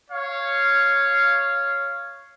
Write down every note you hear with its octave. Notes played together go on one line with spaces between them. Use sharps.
C#5 F5